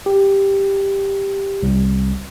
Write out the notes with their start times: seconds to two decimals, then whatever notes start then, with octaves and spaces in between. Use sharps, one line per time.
0.06 G4
1.63 C2